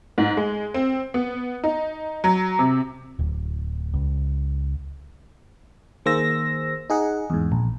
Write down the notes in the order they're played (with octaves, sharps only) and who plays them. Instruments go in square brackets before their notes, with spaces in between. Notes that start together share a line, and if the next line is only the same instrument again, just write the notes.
[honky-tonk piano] G#2
G#3
C4
B3
D#4
F#3
C3
[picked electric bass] D1
C#2
[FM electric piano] D#3 A#3 G#4 C5 E6 A#6
D#4 G#4 F#5
E2 G#2
A#1